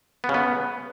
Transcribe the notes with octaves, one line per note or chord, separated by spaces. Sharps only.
B3
C#3
B3